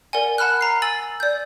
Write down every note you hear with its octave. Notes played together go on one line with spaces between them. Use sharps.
A#4 D5 F#5 G#5
F#5 A5 B5 F6 F#6
A#5 C7
G#5 E6 A6 F#7
D5 G6